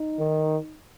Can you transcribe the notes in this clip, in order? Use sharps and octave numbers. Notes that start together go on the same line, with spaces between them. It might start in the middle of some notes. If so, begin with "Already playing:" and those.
Already playing: D#4
D#3